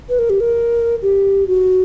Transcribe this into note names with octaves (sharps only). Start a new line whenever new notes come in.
B4
A#4
G4
A#4
G4
F#4